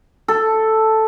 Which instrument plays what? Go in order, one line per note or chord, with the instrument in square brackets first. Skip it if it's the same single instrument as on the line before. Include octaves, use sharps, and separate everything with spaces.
[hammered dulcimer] A4